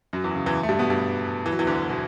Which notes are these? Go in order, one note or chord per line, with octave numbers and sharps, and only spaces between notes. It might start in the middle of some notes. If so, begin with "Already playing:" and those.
F#2 F#3
E2 E3
C#3
E2 E3
A3
G2 G3
B2 B3
G2 G3
E3
F#3
E2 E3
D2 D3
B2